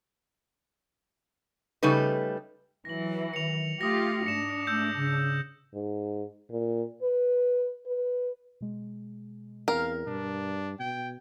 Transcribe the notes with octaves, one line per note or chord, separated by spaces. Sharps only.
C#3 G3 A3 D#4 B4
E3 F#3 A#6 F#7
D#3 C#7 F7
A3 F4 G4 D#6 A#6
G#2 D4 C#7 E7
A3 E6 G6
C#3
G#2
A#2
B4
B4
B2 G#3
E2 C4 A#4 F5 G5 A#5
G2 B2 D4
B2 G5 G#6